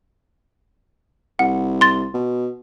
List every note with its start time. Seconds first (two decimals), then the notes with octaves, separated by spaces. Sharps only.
1.39 C2 F#5
1.81 C6 A6
2.14 B2